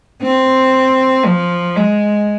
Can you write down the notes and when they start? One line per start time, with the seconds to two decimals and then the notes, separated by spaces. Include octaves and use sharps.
0.22 C4
1.25 F3
1.76 G#3